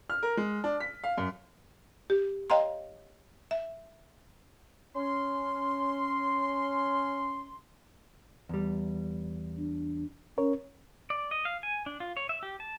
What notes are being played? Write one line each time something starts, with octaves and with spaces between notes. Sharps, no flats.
F6
A#4
G#3
D4
B6
F5
F#2
G4
C#5 D#5 F5 G5 A#5 C6
E5
C#4 C6
E2 G3
D4
C#4 A#4 C#5
D5
D#5
F5
G#5
D4
F4
C#5
E5
G4
A5